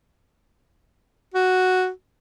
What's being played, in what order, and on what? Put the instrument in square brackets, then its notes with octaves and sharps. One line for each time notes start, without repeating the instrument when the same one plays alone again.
[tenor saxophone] F#4